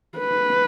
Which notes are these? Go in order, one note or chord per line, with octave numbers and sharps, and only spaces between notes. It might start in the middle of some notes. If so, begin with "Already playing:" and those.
B4